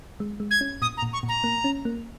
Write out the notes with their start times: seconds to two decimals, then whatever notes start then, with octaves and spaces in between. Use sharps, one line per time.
0.20 G#3
0.40 G#3
0.51 G#6
0.61 C#4
0.82 A#2 D#6
0.97 A#5
1.02 A#2
1.13 C#6
1.23 A#2
1.28 A#5
1.44 A#3
1.64 C#4
1.85 A#3